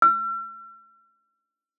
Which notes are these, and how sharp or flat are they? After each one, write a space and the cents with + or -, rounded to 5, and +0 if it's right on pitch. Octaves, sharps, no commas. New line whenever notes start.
E6 +45